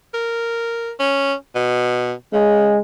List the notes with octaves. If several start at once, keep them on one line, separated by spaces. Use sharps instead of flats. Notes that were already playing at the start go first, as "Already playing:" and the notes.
A#4
C#4
B2
C#3 G#3